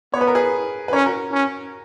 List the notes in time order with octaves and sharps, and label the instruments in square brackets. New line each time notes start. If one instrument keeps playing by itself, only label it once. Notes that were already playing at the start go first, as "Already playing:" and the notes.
[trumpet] B3 [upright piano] C#5
[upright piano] B4
A#4
G#4 B4
B4
[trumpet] C#4 [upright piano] A#4 C#5
[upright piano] F#4 A#4
[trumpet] C#4